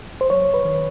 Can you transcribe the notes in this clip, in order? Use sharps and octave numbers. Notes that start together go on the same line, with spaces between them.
C5
F#3 C#5
B4
D#3